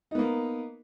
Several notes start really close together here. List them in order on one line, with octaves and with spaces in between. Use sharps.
D#4 B3 A#3